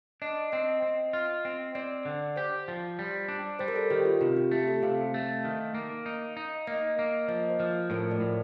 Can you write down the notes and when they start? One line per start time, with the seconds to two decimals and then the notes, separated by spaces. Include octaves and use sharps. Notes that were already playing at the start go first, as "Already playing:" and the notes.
0.22 D4 D#5
0.52 C4 D#5
0.82 C4
1.13 F4
1.45 C4
1.75 C4 D5
2.05 D3
2.36 G4 C5
2.68 F3
2.99 G3
3.28 D4
3.59 G3 C5
3.68 A#4
3.76 A4
3.90 D#3 G4
4.05 F4
4.21 C3 F4
4.37 G4
4.51 A3 G4
4.68 A4
4.83 C3 F5
5.14 A3
5.44 D#3
5.74 A#3
6.06 D#4
6.37 D#4
6.67 A#3 D#5
6.99 A#3
7.28 F3 D#5
7.50 C5
7.60 F3
7.90 A2 A#4
8.11 D5
8.21 A2